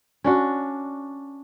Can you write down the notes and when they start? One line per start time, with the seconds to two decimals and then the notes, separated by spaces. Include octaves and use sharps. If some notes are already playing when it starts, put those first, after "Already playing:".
0.24 C#4 D4 F#4